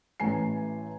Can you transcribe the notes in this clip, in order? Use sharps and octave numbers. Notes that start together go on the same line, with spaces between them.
A1 E3 A3 G#5 A#5 C7